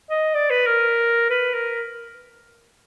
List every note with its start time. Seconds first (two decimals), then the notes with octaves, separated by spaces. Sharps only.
0.10 D#5
0.35 D5
0.50 B4
0.66 A#4
1.30 B4
1.54 A#4